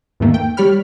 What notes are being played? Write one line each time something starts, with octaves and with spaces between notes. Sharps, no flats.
E2 G#2 D#3 A3 A#3
G5
G3 G4 C#5 B5 F6